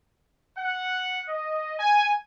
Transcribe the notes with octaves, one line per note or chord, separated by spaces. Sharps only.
F#5
D#5
G#5